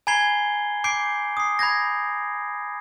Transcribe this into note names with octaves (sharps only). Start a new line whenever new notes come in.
G#5 A#5 B5 G#6 C7 G7
D6 G6 C7 D7
D#6 C7
B5 G6 G#6 A#6